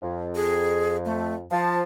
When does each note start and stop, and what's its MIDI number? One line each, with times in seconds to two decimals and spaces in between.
0.03 1.44 41
0.35 0.97 68
1.05 1.34 57
1.51 1.83 53
1.51 1.82 81